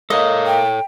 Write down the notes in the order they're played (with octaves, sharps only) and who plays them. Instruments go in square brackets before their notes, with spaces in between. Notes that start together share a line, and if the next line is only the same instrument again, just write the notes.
[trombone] A#3 [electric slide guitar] A4 C#5 [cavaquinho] D#5
[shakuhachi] G5